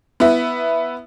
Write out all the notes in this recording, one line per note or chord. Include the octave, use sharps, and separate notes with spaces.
B3 E4 B4 E5